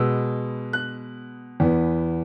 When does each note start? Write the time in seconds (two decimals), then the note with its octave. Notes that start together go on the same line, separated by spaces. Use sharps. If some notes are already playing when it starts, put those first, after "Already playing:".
Already playing: B2 G#3 B3 E6
0.73 F#6
1.60 E2 E3 B3